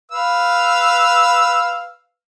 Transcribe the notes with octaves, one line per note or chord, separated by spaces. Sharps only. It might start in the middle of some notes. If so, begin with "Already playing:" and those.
B4 F5 E6